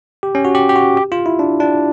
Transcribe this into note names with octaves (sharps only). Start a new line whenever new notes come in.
G4
C#4
F#4
G4
G4
F#4
G4
F4
E4
D4
D4